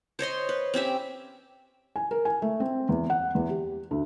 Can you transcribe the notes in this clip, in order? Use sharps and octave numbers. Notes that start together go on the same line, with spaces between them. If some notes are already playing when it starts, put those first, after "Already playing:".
C5 C#5 D#5 C6
B4
C4 C#4 G4 E5
G#5
A#4
G#5
A3
C4
E2
F#5
E2
G4
D2